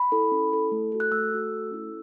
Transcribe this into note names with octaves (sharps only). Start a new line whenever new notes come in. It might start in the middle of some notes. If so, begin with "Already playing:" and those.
Already playing: B5
E4 A4
C#4
E4 A4
A3
F#4 A4
F#6
A3 E6
F#4 A4
A3
C#4 E4 A4